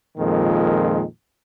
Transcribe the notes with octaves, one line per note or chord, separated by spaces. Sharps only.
F2 A#2 D#3 G#3